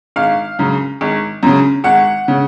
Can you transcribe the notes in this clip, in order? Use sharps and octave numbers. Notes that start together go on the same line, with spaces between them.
G#1 F5
F#2 C#3
G#1
F#2 C#3
G#1 F#5
C#3